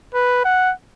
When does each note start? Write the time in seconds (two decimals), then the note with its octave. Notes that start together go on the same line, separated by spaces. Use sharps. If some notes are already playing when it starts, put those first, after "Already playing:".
0.14 B4
0.45 F#5